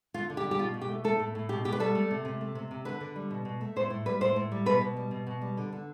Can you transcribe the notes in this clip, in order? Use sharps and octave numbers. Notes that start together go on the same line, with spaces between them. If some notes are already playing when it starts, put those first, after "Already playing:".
D3 F4
D3
G4
G3
G4
B2 F4
B2
G4
A3
A3 A4
A2
A2
B2 G4
B2 G4
B4
G3 A4
A3
C3
C3
A3
C3
C3
D3 B4
D3
G3
B2
B2
A3
A2 C5
A2
G3 B4
A2 C5
A2
G3
B2 B4
B2
G3
B2
B2
G3
D3
D3